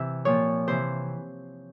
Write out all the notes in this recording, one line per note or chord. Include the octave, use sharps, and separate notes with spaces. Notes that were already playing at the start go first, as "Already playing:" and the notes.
Already playing: C3 E3 E5
A#2 F3 C#5
C3 E3 C5